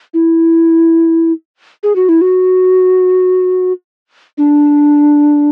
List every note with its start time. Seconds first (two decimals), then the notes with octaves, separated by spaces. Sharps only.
0.14 E4
1.83 G#4
1.96 F#4
2.09 E4
2.21 F#4
4.38 D4